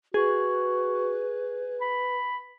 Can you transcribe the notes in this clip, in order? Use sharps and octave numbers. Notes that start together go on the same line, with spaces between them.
F#4 G#4 B4
B5